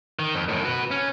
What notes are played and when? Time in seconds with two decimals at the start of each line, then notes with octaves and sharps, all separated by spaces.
0.19 D#3
0.34 F2
0.49 F#2 A2
0.65 F#4 B4
0.91 C#4